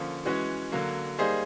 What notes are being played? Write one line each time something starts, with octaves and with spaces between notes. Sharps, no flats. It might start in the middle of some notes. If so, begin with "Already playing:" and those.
Already playing: D3 F3 A#3 C#4
E3 G#3 C#4 F#4
D3 F#3 A#3
G3 A#3 D#4 G#4 C5